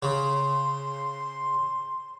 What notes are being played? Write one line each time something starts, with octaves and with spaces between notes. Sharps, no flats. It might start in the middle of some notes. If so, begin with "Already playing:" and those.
C#3 C6